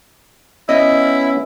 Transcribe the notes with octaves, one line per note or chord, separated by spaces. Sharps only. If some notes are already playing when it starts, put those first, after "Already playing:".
B3 C#4 E4 D#5